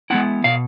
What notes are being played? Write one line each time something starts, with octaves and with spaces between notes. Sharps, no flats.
G#3 B3 E4 F#5
B2 F5